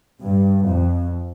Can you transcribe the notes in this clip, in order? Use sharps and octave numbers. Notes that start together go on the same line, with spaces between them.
G2
F2